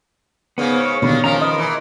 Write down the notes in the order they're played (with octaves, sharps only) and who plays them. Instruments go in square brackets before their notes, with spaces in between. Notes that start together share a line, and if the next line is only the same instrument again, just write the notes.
[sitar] G#2 C#3 A#3 [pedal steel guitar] B3
[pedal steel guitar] C#5
[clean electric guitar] B2 D3 A#3 [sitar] D#3 G3
[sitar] D#3 F3 [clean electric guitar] C#4 [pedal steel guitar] A#4 F5 A#5
[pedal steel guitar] A#4 [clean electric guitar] B4 D#5
[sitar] E3